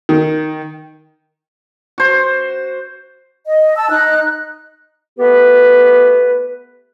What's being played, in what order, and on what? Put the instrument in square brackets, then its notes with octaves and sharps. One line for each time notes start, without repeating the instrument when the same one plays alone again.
[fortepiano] D#3
[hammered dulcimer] F#4 C5
[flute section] D#5
A5 E6
D#4 F#6
[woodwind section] A3 B3 G4 B4